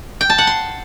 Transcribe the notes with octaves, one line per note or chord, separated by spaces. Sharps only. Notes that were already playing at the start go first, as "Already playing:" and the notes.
G5
A5
F#5
C6